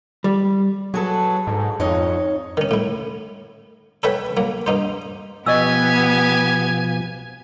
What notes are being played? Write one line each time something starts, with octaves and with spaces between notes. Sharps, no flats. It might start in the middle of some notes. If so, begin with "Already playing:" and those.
G3
F#3 G#4 A4 B4
G#2
F2 D#4 C#5 D#5
D#3 C#4
A2 E4
A4 B4 C#5 E5 G5 G#5
F#3 A#3
G2 D#4 C5
B2 F3 B3 G4 D#5 G#5 C#6 E6